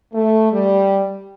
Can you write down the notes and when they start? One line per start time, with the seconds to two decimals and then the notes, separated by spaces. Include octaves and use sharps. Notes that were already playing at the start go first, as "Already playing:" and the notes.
0.14 A3
0.53 G3